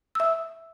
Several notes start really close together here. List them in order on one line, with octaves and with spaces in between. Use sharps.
E6 E5 D#6